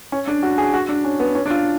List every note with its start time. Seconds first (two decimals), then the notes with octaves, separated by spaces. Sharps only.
0.12 C#4
0.28 D4
0.43 F#4
0.58 G#4
0.74 F#4
0.89 D4
1.05 C#4
1.20 B3
1.35 C#4
1.46 D4
1.51 F4